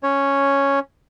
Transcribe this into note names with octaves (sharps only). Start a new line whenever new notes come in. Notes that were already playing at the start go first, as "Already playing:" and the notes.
C#4 C#5